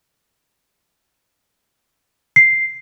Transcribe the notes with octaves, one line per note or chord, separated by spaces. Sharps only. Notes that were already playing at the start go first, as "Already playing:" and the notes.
C7